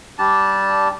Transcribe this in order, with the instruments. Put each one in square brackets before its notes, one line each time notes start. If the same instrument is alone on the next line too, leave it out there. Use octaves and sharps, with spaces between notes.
[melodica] G3 D4 G4 A5